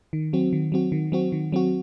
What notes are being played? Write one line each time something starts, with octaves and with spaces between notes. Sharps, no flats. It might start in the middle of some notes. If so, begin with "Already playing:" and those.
D#3
F#3 C4 F#4
D#3
F#3 C4 F#4
D#3
F#3 C4 F#4
D#3
F#3 C4 F#4